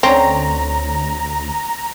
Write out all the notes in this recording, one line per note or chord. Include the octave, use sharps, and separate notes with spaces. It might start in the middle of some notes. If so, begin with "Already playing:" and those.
D2 D3 C4 C#4 G5 A#5